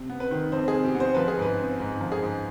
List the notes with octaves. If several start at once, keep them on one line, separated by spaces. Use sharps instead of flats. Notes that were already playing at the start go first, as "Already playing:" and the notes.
Already playing: C3
B3
B4
D#3
F2 C5
G#4
C3
G4
B3
C5
F3 B4
G#4
G#2 B4
C4
G#2
F3
G#4
G#2